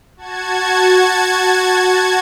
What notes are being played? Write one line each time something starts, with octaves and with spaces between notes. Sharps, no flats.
F#4 A5 G#6